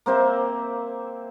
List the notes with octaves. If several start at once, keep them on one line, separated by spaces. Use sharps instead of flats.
A#3 C4 C5 E5